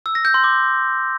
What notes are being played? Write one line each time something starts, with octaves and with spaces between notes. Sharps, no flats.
E6
A#6
G6
C6
D6